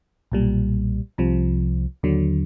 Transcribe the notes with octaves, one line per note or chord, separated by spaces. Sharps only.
B1 A#2 G3
C2 C3 F3
D#2 D3 F#3